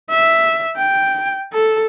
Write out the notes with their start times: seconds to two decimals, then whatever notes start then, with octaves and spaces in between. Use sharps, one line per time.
0.10 E5
0.77 G5
1.53 A4